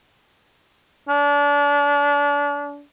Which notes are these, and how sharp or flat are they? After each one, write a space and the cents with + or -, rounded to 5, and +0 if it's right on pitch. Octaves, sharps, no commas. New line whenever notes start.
D4 -35